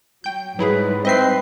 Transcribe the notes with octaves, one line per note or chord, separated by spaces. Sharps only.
F#3 G5 G6
G#2 F#3 G3 E4 G#4 B4
C4 B4 D#5 E5 C7